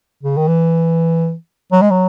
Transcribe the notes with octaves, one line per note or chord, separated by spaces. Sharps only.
C#3
D#3
E3
F#3
G#3
F#3